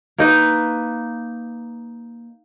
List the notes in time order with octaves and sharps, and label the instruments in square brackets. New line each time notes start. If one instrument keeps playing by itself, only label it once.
[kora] A#3 D#4 B4